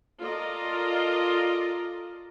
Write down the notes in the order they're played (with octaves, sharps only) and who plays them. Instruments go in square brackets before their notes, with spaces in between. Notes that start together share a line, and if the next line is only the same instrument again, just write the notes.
[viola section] F4 A4 A#4 D5 D#5